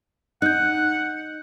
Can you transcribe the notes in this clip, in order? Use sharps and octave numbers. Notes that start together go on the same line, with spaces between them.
D#4 F#5 F#6 G6